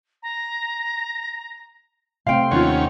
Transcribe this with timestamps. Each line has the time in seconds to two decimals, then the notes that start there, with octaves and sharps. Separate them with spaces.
0.22 A#5
2.27 C3 A3 C4 F5 G5 C6
2.51 D#2 C#4 F4 F#5